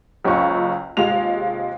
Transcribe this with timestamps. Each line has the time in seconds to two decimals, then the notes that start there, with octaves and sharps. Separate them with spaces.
0.25 F#1 C#2 C#4 F4 C#6
0.97 D#2 C3 G#3 F4 F7